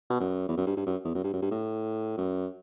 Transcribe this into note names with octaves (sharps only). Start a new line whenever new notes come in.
B2
F#2
E2
F#2
G2
G2
F#2
E2
F#2
G2
F#2
G2
A2
F#2